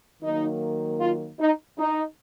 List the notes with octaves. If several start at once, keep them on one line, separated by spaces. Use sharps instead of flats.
D#3 F#3 A#3 D#4
F4
D#4
D#4